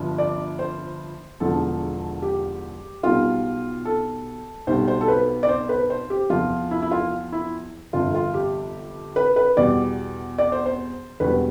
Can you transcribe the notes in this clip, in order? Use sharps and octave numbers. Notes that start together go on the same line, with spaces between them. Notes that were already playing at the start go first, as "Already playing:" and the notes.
Already playing: G1 G2 F3
D5
C5
E1 E2 D3 F3 A4
G4
B1 B2 G3 F4
A4
B1 B2 G3 C5
C5
A4
B4
D5
C5
B4
C5
G4
E2 C3 F3 F4
E4
E4
F4
E4
G1 F2 C3 F4
F4
G4
B4
B4
E2 B2 G3 D5
D5
C5
C5
E1 E2 B2 G3 B4